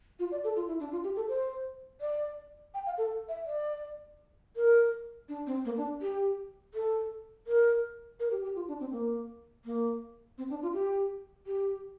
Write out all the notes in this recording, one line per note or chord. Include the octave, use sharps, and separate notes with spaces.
F4
D5
A4
F4
E4
D4
F4
G4
A4
C5
D5
G5
F5
A4
E5
D5
A#4
D4
C4
A#3
D4
G4
A4
A#4
A#4
G4
G4
F4
D4
C4
A#3
A#3
C4
D4
F4
G4
G4